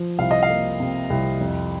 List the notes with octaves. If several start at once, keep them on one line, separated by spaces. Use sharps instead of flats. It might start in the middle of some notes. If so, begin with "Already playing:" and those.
Already playing: F3
C2 F5
D#5
F5
A#3
C3
C2
F2